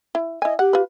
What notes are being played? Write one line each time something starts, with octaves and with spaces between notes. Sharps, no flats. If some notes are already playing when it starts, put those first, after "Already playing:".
E4
E4 D#5 G#5
G4 F#5
F4 B4